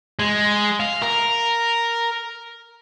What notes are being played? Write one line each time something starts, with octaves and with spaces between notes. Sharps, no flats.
G#3
F5
A#4